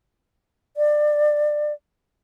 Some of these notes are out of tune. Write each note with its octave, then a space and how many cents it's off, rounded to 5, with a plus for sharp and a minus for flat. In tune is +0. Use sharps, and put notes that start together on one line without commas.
D5 +20